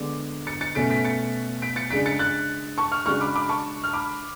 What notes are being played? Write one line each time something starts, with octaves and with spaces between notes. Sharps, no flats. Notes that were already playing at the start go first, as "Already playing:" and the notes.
Already playing: D3 G#3 B3 D4 D6
A6 C#7
A6 C#7
B2 A3 C#4 B6 D7
B6 D7
A6 C#7
B6 D7
A6 C#7
C#3 G#3 D4 B6 D7
A6 C#7
F#6 A6
A5 C#6
C#6 F6
C#3 G#3 D4 F#4 C#6 F6
B5 D6
B5 D6
A5 C#6
F6
B5 D6